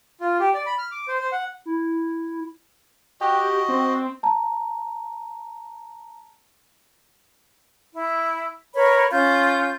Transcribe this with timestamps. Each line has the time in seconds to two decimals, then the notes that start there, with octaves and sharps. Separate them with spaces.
0.21 F4
0.40 G4
0.55 D5
0.66 B5
0.78 F6
0.91 D6
1.08 C5
1.20 C5
1.32 F#5
1.66 E4
3.21 F#4 G4 D#5
3.69 C4
4.23 A5 A#5
7.94 E4
8.75 A#4 B4 C#5 B5
9.11 C#4 F4 G6